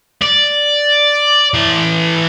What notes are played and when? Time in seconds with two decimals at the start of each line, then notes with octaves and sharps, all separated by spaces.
0.22 D5
1.54 E3 C6